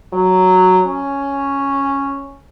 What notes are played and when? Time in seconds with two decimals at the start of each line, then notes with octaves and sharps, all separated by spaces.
0.13 F#3
0.86 C#4